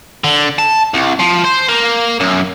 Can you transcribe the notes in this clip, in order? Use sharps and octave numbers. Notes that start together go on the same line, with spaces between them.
D3
A5
C2
F3
C5
A#3
F#2